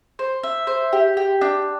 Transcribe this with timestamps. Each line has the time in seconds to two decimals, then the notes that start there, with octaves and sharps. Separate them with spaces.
0.19 C5
0.43 E5
0.67 C5
0.93 G4
1.17 G4
1.41 D4